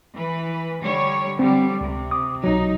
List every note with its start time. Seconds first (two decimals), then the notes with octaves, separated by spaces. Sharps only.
0.14 E3 B4
0.82 D3 G3 C#5
1.39 D3 G3 C4
1.81 C#2 C3
2.11 D6 D#6
2.44 B1 F#3 D#4